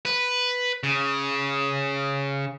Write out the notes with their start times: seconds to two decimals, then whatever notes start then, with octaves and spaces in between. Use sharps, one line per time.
0.05 B4
0.84 C#3